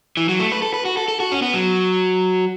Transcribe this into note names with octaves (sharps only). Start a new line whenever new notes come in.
E3
F#3
A3
B4
A4
B4
F#4
A4
A4
F#4
C#4
B3
F#3